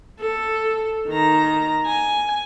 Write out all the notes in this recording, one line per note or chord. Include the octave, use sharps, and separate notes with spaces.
A4
D#3 A#5
G#5